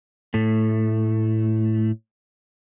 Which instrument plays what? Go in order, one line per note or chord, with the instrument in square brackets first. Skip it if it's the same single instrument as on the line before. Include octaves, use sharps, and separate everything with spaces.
[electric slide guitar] A2 A3